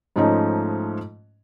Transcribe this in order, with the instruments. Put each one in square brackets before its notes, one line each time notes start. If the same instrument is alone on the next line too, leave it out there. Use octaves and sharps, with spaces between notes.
[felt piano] G#2 F3 A3 C#4 D#4